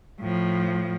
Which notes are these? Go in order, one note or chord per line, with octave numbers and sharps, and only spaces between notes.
A2 F3